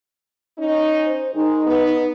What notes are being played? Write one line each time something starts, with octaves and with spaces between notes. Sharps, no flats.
C#4 D#4
C5
D#3 G#3 D#4
B3